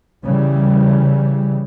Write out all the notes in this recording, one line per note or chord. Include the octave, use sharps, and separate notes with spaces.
C#3 E3 G3